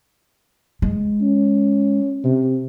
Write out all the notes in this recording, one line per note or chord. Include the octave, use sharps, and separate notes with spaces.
G#3
C#4
C3